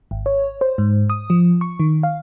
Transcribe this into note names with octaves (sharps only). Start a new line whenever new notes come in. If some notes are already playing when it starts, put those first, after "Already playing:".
G#1
C#5
C5
G#2
D#6
F3
C#6
D#3
F5